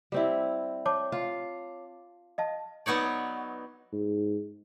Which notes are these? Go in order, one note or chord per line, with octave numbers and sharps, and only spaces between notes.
G3 C4 E4
C#5 A5 D6
F4
D#5 F5 A5
F#3 B3 D#4 C#5 D5
G#2